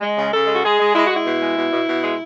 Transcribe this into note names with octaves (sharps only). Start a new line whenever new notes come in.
G#3
C#3
C#3 A4
G#3
F#4
G#3 G#4
G#3
G#3 E4
G#3 F#4
E4
B2
G#3
B2
B2
B2
G#3